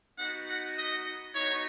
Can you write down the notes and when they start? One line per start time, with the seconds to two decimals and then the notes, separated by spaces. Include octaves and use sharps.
0.19 B3 D#4 F#4 F#5
0.48 F#5
0.77 D#5
1.35 B3 D#4 F#4 C#5